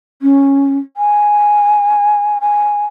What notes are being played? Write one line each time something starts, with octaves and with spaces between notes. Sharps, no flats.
C#4
G#5
G#5